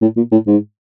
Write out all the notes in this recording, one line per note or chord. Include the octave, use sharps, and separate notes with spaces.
A2
A#2
A2
G#2